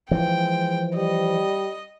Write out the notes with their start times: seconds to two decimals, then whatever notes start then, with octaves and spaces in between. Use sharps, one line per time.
0.11 E3 F3 G#3 G5
0.96 G3 D#5